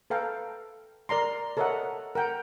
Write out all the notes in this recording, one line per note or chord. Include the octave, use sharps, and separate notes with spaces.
A4 B4 F5 G5 A#5
A#4 D5 A#5 C6
A4 A#4 C#5 D#5 E5 F#5
A#4 F#5 G5